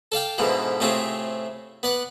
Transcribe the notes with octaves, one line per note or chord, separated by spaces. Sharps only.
A4 D5 F5 G5
G#2 B2 D3 E3 F3
A2 C3 A3 C4 F4 G#4
B3 D5 F#5